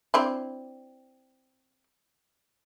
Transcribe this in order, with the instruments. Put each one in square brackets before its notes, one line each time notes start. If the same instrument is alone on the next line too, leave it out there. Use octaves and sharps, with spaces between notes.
[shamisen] C4 D4 E4